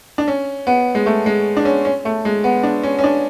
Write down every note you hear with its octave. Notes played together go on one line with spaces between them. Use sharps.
D4
C#4
B3
G#3
A3
G#3
D4
C#4
C#4
A3
G#3
B3
D4
C#4
C#4
D4